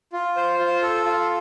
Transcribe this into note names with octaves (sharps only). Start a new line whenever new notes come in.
F4
C5
F4
A4
F4